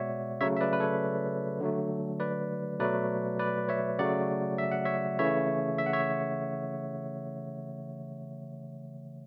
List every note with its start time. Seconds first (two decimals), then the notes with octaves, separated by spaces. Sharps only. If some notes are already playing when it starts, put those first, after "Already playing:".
Already playing: B2 G#3 C#5 D5 E5 F#5
0.41 C#3 F#3 A3 C#5 E5
0.57 E5
0.60 B4 D5
0.73 B4
0.80 A4 C#5
1.60 D3 F#3 A3
2.20 B4 D5
2.79 B2 F#3 A3 B4 D5
3.39 B4 D5
3.69 C#5 E5
3.99 C#3 F#3 A3 D5 F#5
4.58 E5
4.71 F#5
4.85 C#5 E5
5.19 C#3 E3 A3 C#5 E5
5.78 E5
5.86 F#5
5.93 C#5 E5